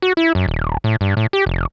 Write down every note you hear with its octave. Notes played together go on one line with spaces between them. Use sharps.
F#4
E4
F#2
D#1
A2
G2
A2
G4
F1